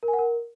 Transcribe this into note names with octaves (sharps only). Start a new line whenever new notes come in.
A#4
G#5
F#5
A#4